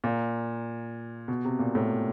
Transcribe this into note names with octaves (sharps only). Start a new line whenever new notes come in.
A#2
B2
C3
A#2
A2